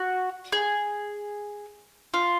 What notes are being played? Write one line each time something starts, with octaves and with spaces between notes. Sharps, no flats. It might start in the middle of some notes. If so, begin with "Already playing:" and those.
Already playing: F#4
G#4
F4